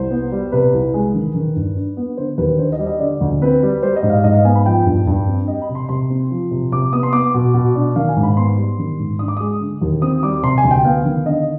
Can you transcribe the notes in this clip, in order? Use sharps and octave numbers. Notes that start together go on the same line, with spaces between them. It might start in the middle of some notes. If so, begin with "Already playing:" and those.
Already playing: C2 C5
B3
G3
C3 B4
C2
G#3
D#3
D#3
G2
D4
B3
D3 C5
D#2 B4
D4 C5
D#5
G3
D#5
D3 D5
D2
C4 B4
G3
G3 C5
D#5
G#2
F5
G#2 D#5
F5
B3 G#5
B5
F3 G5
G2
G2
C4
G3 D#5
B5
C3
C6
C3 C6
C4
F3
C3
C3 D6
B3 D#6
C6
B3 D6
B2
B2
D4
D#3 F5
G#5
G#2
B5
B3 C6
G3
D#3
G#2
D4 D#6
D6
G#3 D#6
D3
D#2
C4 D#6
G3 D6
C3 C6
G#5
D2
G5
B3 F5
D#3
D3 D#5